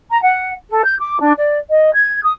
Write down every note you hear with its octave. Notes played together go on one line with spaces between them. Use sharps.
A#5
F#5
A4
G6
D6
D4
D5
D#5
G#6
D#6